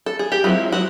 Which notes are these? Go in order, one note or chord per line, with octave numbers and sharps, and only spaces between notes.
A4
G#4
G4
F3 F#3 G#3 C4 E4 F#4
F#3 F#4